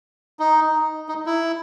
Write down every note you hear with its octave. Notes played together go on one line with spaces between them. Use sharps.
D#4
D#4
E4